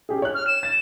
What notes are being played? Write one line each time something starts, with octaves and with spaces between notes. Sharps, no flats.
C#4 G4 G#4
C#5 F#6
F6
E7
A6